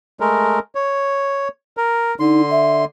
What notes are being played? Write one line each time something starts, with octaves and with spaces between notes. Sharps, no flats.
G#3 A3 A#4
C#5
A#4
D3 D#4 C6
E5